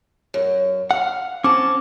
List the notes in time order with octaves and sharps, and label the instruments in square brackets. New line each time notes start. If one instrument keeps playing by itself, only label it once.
[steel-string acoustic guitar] F#2
[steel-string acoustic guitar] F5 [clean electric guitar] F#5
[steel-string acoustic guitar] C4 A5 [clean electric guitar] C#4 [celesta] D6